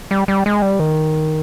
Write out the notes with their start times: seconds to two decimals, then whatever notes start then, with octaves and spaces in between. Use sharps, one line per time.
0.11 G3
0.28 G3
0.46 G#3
0.62 G3
0.79 D#3